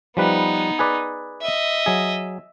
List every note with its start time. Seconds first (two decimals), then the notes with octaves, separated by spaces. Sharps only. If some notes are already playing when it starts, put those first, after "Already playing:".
0.17 F3 G3 B3 D#4 B4
0.79 G#4 B4 D5
1.41 D#5 E5
1.86 F#3 G#4